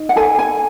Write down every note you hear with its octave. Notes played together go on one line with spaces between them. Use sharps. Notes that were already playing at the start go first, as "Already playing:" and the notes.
Already playing: D#4
F#5
A4 G#5
G#5